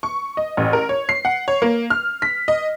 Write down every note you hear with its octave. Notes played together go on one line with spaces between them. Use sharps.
C#6
D#5
A1
A#4
C#5
C7
F#5
C#5
A#3
F6
B6
D#5